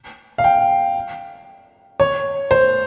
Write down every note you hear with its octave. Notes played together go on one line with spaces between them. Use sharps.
F5
G5
C#5
C5